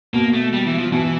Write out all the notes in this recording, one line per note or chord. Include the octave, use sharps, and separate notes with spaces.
B2 A#3
A3
G3
E3
F3
B2 E3